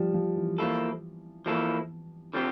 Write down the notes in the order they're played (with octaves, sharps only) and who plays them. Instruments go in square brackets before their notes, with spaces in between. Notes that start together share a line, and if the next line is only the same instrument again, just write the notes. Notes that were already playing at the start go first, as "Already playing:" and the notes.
Already playing: [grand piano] F3 G3
F3
E3
[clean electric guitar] F3 A#3 E4 A4
[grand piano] E3 [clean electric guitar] F3 A#3 E4 A4
[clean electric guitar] D3 F3 C4 G4